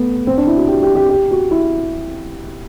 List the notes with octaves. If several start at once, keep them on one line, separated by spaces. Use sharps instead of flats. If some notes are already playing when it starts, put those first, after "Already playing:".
Already playing: A3 B3
C4
D4
E4
F#4
G4
G4
G4
G4
F#4
E4